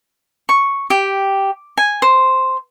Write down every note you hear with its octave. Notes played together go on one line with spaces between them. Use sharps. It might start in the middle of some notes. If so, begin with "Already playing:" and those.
C#6
G4
G#5
C5